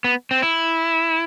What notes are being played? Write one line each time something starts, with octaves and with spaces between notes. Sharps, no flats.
B3
C4
E4